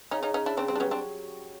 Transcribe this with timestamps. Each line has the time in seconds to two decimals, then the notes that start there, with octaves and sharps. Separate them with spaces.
0.11 C#3 C#4 D#4
0.23 C#4 D#4
0.34 C#4 D#4
0.46 D4 E4
0.57 C#3 C4 D4
0.68 G3 C4
0.75 D4
0.80 F#3 B3 C#4
0.91 C4 D4